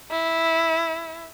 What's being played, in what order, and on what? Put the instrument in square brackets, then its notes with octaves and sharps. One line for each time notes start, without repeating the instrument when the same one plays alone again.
[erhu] E4